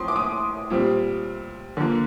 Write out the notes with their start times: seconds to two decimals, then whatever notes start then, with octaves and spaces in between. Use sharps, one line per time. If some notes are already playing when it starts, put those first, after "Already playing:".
Already playing: A2 F3 C4 C6 D#6
0.08 D6
0.16 D#6
0.70 A#2 G3 C4
1.77 D3 F3 A#3